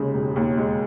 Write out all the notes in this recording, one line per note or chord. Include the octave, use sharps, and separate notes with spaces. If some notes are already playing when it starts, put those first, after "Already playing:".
Already playing: D#2 C#3 G#3
E1
D#2
G#3